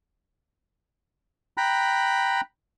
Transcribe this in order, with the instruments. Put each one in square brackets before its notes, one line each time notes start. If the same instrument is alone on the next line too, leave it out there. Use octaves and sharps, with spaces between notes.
[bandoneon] G5 A#5 B5 F#6